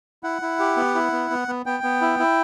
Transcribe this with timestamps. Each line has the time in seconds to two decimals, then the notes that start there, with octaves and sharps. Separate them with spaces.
0.23 E4 F#5
0.42 E4
0.59 G4
0.77 B3
0.95 E4
1.12 B3
1.31 B3
1.48 B3
1.66 B3 G5
1.83 B3
2.02 E4
2.19 E4